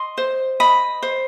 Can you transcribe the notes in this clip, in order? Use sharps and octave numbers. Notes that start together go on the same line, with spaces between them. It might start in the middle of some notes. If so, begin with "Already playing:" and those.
Already playing: D#5 C6
C5
D#5 B5
C5